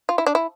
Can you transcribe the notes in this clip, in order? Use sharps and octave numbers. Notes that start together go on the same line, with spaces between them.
F4
E4
D4
E4